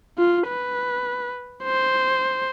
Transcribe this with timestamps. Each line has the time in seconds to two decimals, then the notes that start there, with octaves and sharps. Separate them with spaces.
0.18 F4
0.48 B4
1.64 C5